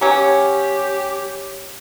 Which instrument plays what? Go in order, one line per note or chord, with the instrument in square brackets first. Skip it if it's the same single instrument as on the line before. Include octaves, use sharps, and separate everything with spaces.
[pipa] F#3 C#4 [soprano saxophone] G4